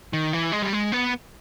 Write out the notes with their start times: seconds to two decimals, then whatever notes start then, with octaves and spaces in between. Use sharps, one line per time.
0.13 D#3
0.33 E3
0.52 G#3
0.62 G3
0.73 G#3
0.92 B3